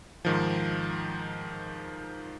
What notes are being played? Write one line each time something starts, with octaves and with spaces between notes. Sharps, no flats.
G#2 D#3 F3